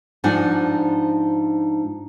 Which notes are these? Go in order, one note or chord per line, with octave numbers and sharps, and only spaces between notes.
G#2 F3 D4 D#4 F#5 G#5